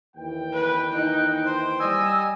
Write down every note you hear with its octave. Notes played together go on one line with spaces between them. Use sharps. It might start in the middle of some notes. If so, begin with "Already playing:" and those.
D#2 E3 G5
B4
D#4 F#6
C5
G3 D#5 G#5 E6